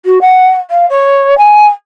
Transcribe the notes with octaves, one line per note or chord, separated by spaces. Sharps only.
F#4
F#5
F5
C#5
G#5